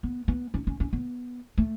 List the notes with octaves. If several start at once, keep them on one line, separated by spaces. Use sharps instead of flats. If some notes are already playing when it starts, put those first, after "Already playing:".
B3
B3
C#4
C#4
C#4
B3
A3